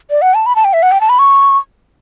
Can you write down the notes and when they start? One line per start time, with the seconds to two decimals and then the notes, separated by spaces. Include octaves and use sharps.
0.10 D5
0.22 F#5
0.34 A5
0.46 B5
0.56 A5
0.65 G5
0.73 E5
0.83 F#5
0.92 G5
1.01 A5
1.09 B5
1.19 C#6